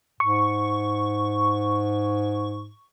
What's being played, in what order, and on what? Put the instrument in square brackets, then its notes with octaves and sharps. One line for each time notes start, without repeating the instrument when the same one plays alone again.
[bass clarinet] G#2 [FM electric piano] C#6